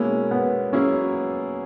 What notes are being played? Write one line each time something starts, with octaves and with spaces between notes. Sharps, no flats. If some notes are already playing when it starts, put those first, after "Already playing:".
Already playing: B2 G#3 A#3 C#4 E4
B3
F#3 A#3 C#4 E4 G#4